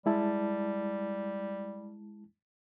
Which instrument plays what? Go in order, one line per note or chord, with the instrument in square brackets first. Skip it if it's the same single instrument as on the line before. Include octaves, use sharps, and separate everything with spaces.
[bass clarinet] G3 [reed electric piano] G#3 E4 A5